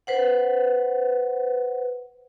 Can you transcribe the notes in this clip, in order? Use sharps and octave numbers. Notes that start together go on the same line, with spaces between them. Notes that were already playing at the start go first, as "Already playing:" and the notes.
B4 C5 F#5